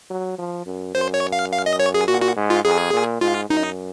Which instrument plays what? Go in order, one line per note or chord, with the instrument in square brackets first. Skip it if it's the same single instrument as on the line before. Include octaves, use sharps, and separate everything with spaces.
[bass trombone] F#3
F3
F#2
[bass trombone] F#2 [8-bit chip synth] C5
[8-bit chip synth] C#5
F5
F5
D#5
C#5
G#4
[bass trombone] A#2 [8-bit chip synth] F#4
[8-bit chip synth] F#4
[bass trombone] G#2
[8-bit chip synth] F4
[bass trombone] F2 [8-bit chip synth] G#4
[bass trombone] A#2
[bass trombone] G#2 [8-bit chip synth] F4
[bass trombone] F#2 [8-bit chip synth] D#4